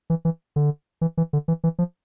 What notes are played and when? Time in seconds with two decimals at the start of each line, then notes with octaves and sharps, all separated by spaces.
0.10 E3
0.25 E3
0.56 D3
1.01 E3
1.18 E3
1.33 D3
1.48 E3
1.64 E3
1.79 F3